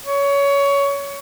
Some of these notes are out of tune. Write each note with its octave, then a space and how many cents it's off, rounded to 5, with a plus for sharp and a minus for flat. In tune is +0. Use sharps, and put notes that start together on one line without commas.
C#5 +20